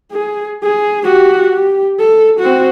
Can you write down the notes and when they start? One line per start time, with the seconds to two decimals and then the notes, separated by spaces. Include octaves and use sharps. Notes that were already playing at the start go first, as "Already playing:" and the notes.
0.12 G#4
0.63 G#4
1.05 F#4 G4
1.53 G4
1.99 A4
2.40 C4 F#4